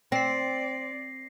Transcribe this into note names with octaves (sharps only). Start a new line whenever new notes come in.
C4 D5 A#6 C7